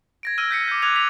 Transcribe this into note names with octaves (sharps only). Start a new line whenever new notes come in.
G#6 A#6 D7
E6 F6 D#7
G6 B6 C#7
D6 G6
D6 F6 F#6 G#6 D#7 F7
B6 F7